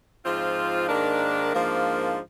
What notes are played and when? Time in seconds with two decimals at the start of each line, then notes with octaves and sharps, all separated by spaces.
0.24 G#2 F3 C4 F4
0.89 G#2 D#3 A#3 D4
1.52 G#2 F3 A#3 D4